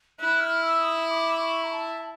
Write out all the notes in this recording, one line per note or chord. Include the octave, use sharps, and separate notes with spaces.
E4 F#6
F6
E6
D#6
D6
C#6
A#5
A5